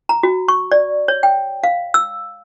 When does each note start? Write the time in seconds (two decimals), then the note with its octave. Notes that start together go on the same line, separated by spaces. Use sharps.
0.09 A#5
0.23 F#4
0.48 C#6
0.72 D5
1.08 C#5
1.23 G5
1.64 F5
1.94 E6